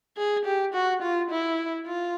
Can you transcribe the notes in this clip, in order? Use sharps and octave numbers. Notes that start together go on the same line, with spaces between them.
G#4
G4
F#4
F4
E4
F4